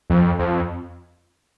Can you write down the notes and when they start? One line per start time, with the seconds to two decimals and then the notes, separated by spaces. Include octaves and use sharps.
0.10 F2
0.39 F2